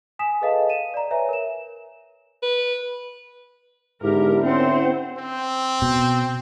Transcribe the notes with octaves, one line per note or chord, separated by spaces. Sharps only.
G#5 D#6 B6 E7
G#4 A4 B4 D#5 F5 A5
D#7 E7
D5 A#5
B4 C#5 E5 G#5
A#4 E7
B4
G#2 D3 B3 E4 G4 A#4
C4 C#4 C5 F#5
C4
B2